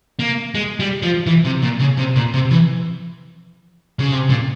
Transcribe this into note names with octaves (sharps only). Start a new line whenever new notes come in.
A#3
G#3
G3
F3
E3
C3
A#2
C#3
C3
A#2
C3
E3
C#3
C3
A#2